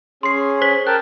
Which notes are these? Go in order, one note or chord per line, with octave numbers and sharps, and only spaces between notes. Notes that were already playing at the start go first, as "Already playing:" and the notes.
C#4 G#4 C6 C7
C5 B6 F#7
A#4 G5 A5 F#6